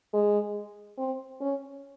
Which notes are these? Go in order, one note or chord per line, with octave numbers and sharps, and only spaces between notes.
G#3
C4
C#4